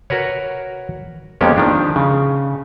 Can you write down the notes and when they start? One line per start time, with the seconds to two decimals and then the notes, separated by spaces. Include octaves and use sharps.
0.10 F#4 A#4 B4 C#5
1.41 F2 G#3 A#3 B3 C#4 G4
1.57 D#3 F3 D4
1.96 C#3